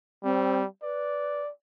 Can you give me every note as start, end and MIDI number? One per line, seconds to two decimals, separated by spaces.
0.23 0.66 55
0.23 0.61 60
0.83 1.41 71
0.83 1.51 74